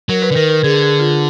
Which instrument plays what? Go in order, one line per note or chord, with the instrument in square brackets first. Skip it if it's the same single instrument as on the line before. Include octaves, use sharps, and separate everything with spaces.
[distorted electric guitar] F#3 [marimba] A#4
[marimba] B4
[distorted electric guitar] D3
[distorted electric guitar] D#3 [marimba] A#4
[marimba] A#4
[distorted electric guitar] D3 [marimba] G#4
[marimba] G#4
F4